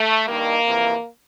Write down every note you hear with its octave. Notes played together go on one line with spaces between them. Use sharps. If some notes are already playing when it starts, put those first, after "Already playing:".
Already playing: A3
G2 D#3 A#3
F2 C3 E3